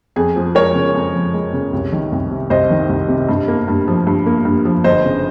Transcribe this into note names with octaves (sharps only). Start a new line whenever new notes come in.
F2 G#4
F3
G#3 A#4 C#5
C#3
F2
F3
G#3
C#3
C2
D#3
C2
C3
C2 C5 D#5
D#3
C2
C3
G2
A#3
G2
F3
G2
A#3
G2
F3
G1 C5 D#5
C#3